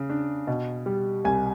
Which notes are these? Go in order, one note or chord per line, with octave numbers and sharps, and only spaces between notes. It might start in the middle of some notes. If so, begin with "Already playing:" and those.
Already playing: C#3
D4
B2
G3
C2 G#5